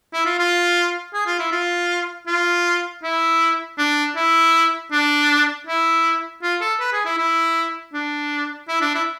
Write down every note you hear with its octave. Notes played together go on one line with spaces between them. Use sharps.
E4
F4
F4
G#4
F4
E4
F4
F4
E4
D4
E4
D4
E4
F4
A4
B4
G#4
E4
E4
D4
E4
D4
E4